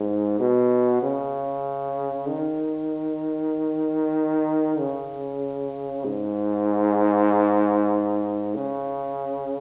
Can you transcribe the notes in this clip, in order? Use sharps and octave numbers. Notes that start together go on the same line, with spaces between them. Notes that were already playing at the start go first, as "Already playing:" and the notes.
Already playing: G#2
B2
C#3
D#3
C#3
G#2
C#3